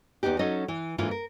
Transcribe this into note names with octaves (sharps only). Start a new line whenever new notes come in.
E2 G#2 B3 D#4 G4
F#3 C#4 D#4 A4 D#5
E3
G#2 D3 E3 A#3 E4 F4
A#4